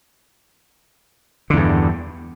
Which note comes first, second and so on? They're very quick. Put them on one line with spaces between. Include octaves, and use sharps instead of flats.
D3 E2 G2